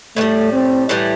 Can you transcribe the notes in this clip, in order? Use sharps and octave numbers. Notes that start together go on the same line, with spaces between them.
A2 E3 G3 A3
C4
A2 E3 G3